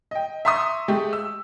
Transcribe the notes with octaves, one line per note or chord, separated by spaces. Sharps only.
D#5 G5
E5 A#5 C6 C#6 D#6
G#3 A3 G4
E6